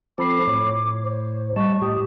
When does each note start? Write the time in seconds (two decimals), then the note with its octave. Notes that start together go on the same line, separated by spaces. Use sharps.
0.18 F3 C4 A4 B5 D6 C7
0.47 A2 C#5
1.04 C5
1.56 G3 D#5 A5 C#6
1.82 A2 G4 D#6